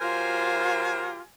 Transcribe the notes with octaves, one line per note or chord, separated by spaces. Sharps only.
F#3 F4 G4 A#4 C5 G#5